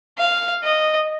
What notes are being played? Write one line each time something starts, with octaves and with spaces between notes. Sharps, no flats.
F5
D#5